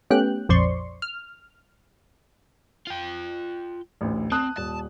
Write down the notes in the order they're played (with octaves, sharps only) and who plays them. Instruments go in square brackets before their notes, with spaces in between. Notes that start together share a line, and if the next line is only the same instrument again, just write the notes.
[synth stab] A3 B3 C#4 G4 G5 F#6
A#1 F2 C5 D5 C6 C#6
F6
[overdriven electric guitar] F4 G5
[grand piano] A1 D2
[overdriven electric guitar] C4 [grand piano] A5 D#6 F#6
[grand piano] D#1 [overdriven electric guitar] A5